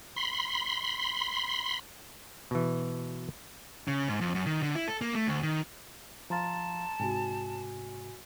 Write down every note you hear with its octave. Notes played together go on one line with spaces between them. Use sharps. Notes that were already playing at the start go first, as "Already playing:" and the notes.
B5 C6
B2 E3
C#3
G#2
F2
F#2
D#3
D3
E4
A4
A#3
A3
D2
D#3
F3 F5 A5 A#5 C6 A6
G#2 C3 F#4 G#5